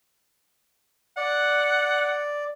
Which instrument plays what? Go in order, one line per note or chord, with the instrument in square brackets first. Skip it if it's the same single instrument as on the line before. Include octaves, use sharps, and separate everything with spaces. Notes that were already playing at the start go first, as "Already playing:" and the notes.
[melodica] D5 [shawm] F#5